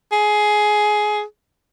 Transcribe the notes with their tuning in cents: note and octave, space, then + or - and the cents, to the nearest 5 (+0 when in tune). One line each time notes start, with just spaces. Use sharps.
G#4 +15